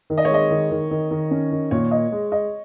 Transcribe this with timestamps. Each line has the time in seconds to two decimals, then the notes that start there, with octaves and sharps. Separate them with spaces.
0.10 D#3
0.18 D#5
0.25 C#5
0.30 G#3 D#5
0.51 D#3
0.71 D#3
0.91 D#3
1.11 D#3
1.31 C#4
1.52 D#3
1.71 A#2 C#5
1.91 D#5
2.12 G#3
2.32 D#5